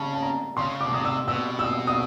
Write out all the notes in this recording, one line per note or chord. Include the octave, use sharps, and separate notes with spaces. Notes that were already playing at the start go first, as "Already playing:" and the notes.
Already playing: C#3 A5
A5
A#5
C#3 C6
B2 D6
C3 D#6
E6
B2 E6
E6
D#6
D#6